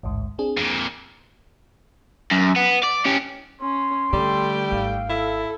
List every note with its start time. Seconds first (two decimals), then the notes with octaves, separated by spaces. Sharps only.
0.03 A1 D2 G#2
0.39 C4 D4 G#4
0.58 F2 A#2
2.31 F#2
2.56 B3
2.83 D5
3.06 C#4 G4
3.61 C#4 C6
4.13 D3 G3 A3 G5
4.72 G#1 F5
5.09 E4 A4